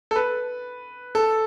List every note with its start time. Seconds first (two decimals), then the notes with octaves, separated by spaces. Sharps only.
0.11 A4
0.16 B4
1.15 A4